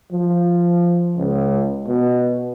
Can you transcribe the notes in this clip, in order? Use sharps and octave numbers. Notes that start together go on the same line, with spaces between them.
F3
C#2
B2